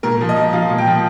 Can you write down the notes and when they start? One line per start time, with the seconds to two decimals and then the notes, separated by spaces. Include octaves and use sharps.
0.03 A#2 A#4
0.21 F3
0.29 D#5
0.36 F3
0.53 F3 F5
0.70 A#2
0.78 G5
0.87 F3